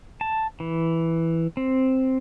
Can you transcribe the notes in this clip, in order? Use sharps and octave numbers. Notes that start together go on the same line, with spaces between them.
A5
E3
C4